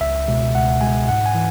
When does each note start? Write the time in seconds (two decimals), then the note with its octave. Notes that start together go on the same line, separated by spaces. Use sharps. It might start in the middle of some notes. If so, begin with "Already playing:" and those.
0.01 C#2 E5
0.28 B2 G#3
0.55 C#2 F#5
0.81 B2 G#3 G#5
1.08 G#2 F#5
1.26 G#5
1.35 E3